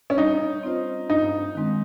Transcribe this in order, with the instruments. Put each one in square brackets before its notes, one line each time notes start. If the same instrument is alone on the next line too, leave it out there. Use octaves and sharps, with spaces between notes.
[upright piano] C#4
[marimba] G3 [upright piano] D#4
[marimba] C4 F4 C5 D#5
[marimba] G2 [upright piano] D#4
[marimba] D#3 G#3 C4